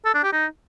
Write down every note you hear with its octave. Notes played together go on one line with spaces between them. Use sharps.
A4
D4
G4
D#4